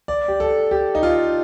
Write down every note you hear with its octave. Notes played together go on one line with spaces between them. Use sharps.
D5
G4
A4
G4
D#4
F4